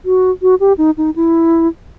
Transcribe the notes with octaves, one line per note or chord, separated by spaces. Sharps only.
F#4
F#4
G4
D#4
D#4
E4